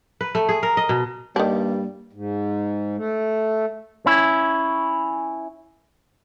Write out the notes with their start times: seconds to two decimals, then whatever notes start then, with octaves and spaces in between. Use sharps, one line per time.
0.21 B4
0.35 A3
0.49 G#4
0.63 A#4
0.77 D#5
0.89 B2
1.36 G2 D#3 G3 A#3 D4
2.13 G#2
2.96 A3
4.06 C#4 E4